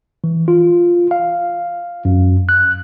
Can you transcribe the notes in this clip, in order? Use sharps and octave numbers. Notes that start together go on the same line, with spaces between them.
E3
F4
F5
F#2
F#6